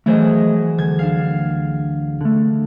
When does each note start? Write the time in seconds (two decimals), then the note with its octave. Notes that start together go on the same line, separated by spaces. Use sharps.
0.06 E3 F#3 A3 G#4 C5 D#5
0.78 D2 G#6
0.99 D4 F5
2.21 D3 A3